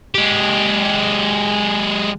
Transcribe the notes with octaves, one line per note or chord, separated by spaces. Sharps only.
G#3 G4